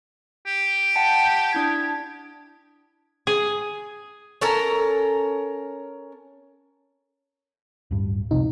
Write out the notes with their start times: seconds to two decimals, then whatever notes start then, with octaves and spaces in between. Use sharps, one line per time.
0.47 G4
0.96 F#5 G5 A5
1.53 D4 E4 G#6
3.27 G#4
4.41 C#4 A4 A#4 A#5
7.91 D1 G2
8.31 C2 F2 C3 D#4